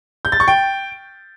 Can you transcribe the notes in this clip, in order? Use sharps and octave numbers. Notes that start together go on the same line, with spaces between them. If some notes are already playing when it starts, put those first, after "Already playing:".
G6
A6
C#6
G5